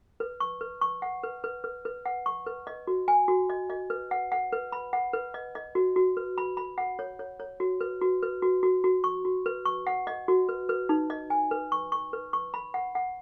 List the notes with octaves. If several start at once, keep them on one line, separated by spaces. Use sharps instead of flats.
B4
C#6
B4
C#6
F#5
B4
B4
B4
B4
F#5
C#6
B4
D#5
F#4
G#5
F#4
D#5
D#5
B4
F#5
F#5
B4
B5
F#5
B4
D#5
D#5
F#4
F#4
B4
B5
B5
F#5
C#5
C#5
C#5
F#4
B4
F#4
B4
F#4
F#4
F#4
C#6
F#4
B4
C#6
F#5
D#5
F#4
B4
B4
D#4
D#5
G#5
B4
C#6
C#6
B4
C#6
B5
F#5
F#5